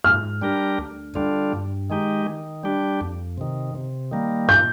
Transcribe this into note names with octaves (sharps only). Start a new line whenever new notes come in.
G#2 F6
G3 D4 G4 A#4
D2
D3 G3 D4 F4
G2
D#3 G#3 D#4 G4
D#3
G3 D4 G4
F2
C3 D#3
C3
D#3 G3 A#3
A#2 G6